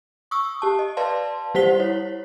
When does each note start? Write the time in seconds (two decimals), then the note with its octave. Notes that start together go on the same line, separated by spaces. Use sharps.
0.31 C#6 D#6 E6
0.62 G4 A5
0.79 D#5
0.97 B4 D5 F5 A5 C6
1.55 G3 G4 C5 F#5 B6 G7
1.79 E4 C#5